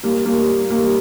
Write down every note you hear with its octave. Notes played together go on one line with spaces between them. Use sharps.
G3 A#3
G3 A#3
G3 A#3